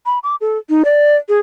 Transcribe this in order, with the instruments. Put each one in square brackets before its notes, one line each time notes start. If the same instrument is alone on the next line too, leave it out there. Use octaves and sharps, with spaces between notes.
[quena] B5
D6
A4
D#4
D5
G#4